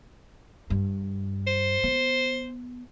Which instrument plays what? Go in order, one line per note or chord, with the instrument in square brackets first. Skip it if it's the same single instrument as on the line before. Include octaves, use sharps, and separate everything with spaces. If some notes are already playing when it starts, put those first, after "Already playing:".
[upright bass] G2
[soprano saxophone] C5
[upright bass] B3